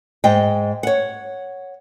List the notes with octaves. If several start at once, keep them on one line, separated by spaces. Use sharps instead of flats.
G#2 D#5 G5
C#5 F#5